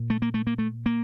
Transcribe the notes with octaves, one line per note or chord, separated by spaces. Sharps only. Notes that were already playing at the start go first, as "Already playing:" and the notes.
Already playing: A#2
A3
A#3
A3
A#3
A3
A#3